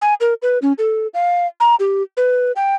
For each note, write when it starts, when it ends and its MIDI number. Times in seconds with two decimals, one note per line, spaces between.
0.02 0.14 80
0.21 0.34 70
0.42 0.58 71
0.62 0.73 61
0.78 1.07 69
1.14 1.47 77
1.60 1.75 82
1.80 2.03 67
2.17 2.52 71
2.56 2.75 79